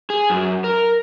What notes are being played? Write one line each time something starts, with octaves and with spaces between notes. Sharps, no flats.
G#4
F#2
A#4